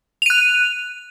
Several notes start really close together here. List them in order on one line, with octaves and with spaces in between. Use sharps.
F7 D#7 F#6